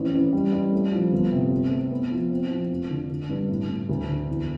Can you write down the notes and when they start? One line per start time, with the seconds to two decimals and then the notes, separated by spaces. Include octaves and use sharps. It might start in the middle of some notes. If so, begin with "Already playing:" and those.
Already playing: A1 C4
0.13 A1
0.33 G3
0.53 G3
0.73 A3
0.92 F3
1.12 G1
1.32 C3
1.51 C4
1.71 A3
1.91 B3
2.11 F3
2.30 C4
2.51 F3
2.71 F1
2.90 D3
3.10 D3
3.29 G2
3.49 A2
3.69 A2
3.89 D2
4.08 D3
4.28 E2